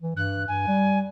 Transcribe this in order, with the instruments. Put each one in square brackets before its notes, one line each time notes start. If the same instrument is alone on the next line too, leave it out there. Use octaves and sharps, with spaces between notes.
[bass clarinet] E3
[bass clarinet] G2 [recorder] F#6
[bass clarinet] G2 [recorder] G#5
[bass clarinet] G3